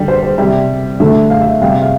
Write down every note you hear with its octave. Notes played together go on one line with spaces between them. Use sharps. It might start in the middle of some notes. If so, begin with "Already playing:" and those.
Already playing: D3 G3
C5
C5
C3 G3 E5
D3 A3 E5
F5
E5
C3 G3 F5
E5
F5